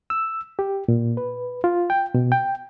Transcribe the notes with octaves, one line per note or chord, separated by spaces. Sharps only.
E6
G4
A#2
B4
F4
G5
B2
G5